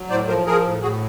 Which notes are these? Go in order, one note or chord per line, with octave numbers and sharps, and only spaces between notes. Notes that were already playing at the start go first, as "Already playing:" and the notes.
Already playing: F#3
A2 C5 D5
F3 A#4 C5
F3 G#4 A#4
A2
A2 F#4 G#4